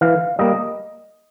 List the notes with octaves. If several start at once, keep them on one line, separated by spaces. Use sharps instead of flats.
E3 F5
G3 A#3 D#5